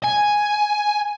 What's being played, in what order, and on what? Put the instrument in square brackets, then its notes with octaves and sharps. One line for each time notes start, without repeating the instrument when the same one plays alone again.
[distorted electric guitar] G#5